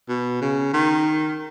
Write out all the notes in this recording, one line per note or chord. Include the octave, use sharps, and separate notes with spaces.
B2
C#3
D#3